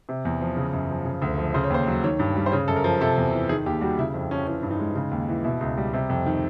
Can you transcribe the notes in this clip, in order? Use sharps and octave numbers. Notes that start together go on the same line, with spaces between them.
C3
E2
F3
C#3
F#2
F3
C#3
D2
F3
C#3 C5
C#5
D#2 C5
F#3
D#3 C#5
G2
G3
C5
C#3 C#5
F#2 A4
A#4
F3
C3 A4
E2
E3
D#3 G#4
D#2 G4
G3 F#4
C#3 E4
F2
F3 C#4
E3 C#4
G2
D#4
G#3
C#3 D#4
D#2
E3
B2 E4
C#2
G3
C3
F2
D#3